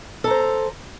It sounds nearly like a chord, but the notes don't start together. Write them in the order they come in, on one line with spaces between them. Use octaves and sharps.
A4 A#5 C5